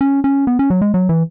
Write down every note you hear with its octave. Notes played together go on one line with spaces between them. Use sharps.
C#4
C#4
B3
C#4
F#3
G#3
F#3
E3